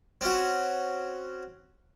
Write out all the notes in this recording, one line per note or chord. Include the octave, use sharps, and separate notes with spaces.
C4 C#4 F#4